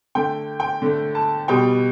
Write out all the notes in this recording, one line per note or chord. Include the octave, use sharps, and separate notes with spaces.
D3 A3 G5
G5
D3 A3
A5
B2 G3 G5